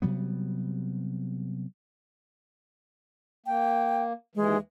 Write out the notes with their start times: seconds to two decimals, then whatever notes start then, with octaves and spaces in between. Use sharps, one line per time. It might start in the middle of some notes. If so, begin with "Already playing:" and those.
0.02 C3 F#3 G3 B3
3.46 A#3 G5
4.35 D#2 E3 G#3